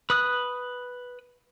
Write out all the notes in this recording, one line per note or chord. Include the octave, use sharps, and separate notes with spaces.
B4 D#6 F#6